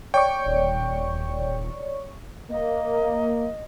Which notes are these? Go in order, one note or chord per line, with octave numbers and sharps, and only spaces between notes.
C#5 D5 G5 C#6
D#1
A#3 D#5